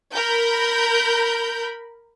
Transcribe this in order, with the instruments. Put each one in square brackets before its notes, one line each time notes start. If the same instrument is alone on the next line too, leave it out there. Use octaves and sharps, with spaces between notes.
[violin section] A#4 B5 G6